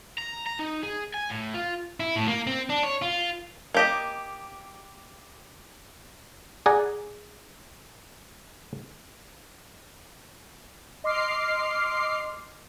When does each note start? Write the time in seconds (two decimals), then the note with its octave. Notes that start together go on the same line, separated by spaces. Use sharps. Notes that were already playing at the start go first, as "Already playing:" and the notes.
0.18 A#5
0.46 A#5
0.59 D#4
0.83 G#4
1.14 G#5
1.30 A2
1.54 F4
2.00 E4
2.16 A2
2.28 A#3
2.47 C4
2.70 D4
2.83 C#5
3.02 F4
3.74 A#3 G4 D#5
6.66 G#4 D5 F#5 G#5 A#5
11.04 D#5 C6 D6 F6 C7